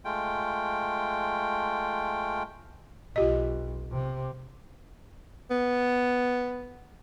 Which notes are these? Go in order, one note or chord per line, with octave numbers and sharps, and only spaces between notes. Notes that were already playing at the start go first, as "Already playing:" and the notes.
G#3 A3 F4 G5
B1 F4 G4 D#5
C3
B3